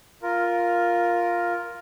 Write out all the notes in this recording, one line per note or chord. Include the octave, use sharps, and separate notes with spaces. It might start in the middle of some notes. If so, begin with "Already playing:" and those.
F4 A#4